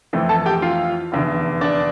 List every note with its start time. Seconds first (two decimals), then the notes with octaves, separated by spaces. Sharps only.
0.13 F2 E3 A3
0.29 A4 A5
0.46 G4 G5
0.62 F4 F5
1.12 F1 E2 D3
1.61 D4 D5